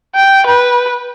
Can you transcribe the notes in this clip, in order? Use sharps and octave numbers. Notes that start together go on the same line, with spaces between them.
G5
B4